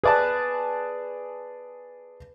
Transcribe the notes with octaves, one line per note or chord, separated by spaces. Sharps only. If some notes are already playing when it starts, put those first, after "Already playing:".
G#4 B4 D5 A5